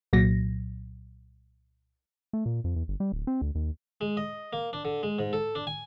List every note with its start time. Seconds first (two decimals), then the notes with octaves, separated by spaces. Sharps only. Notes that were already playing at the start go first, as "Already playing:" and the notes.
0.13 C2 A#2 F#3 A#6
2.33 A3
2.46 A#2
2.64 F2
2.76 E2
2.88 G1
3.00 G3
3.12 D1
3.27 C4
3.41 D2
3.55 D#2
4.01 G#3
4.17 D#5
4.53 A#3
4.73 D4
4.85 D3
5.03 G#3
5.19 G#2
5.33 A4
5.55 D4
5.67 G#5